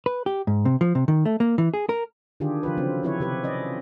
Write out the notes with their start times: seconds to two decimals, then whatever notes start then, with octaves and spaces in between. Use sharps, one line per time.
0.06 B4
0.26 G4
0.47 G#2
0.65 C3
0.81 F3
0.95 C3
1.08 D#3
1.25 A3
1.40 A#3
1.58 E3
1.74 G#4
1.89 A#4
2.40 D3 D#3 D4 F4 G4 G#4
2.63 D3 F3 F4 B4
2.77 C#3 F#3 C4
3.03 F3 C4 E4 B4 C#5
3.20 C3 G4 B4
3.44 C#4 D5 D#5